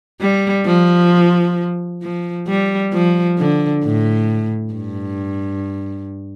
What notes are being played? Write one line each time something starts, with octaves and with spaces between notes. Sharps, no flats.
G3
F3
F3
G3
F3
D3
A2
G2